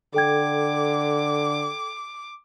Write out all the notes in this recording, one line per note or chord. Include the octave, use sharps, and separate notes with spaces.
D3 A4 G5 D6 G#6